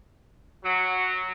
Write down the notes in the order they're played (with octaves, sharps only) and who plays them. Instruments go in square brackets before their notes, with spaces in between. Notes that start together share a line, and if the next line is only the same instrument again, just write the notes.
[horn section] F#3